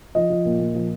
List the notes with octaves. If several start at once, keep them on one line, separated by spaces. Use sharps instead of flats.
F3 D#5
F3
A#2
A#2
F3